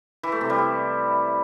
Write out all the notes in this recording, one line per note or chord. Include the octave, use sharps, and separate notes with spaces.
E3
A3
C3
G3
E4